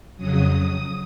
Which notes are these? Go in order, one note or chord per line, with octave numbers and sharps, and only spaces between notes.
F2 C#3 F#3 D#6
D#6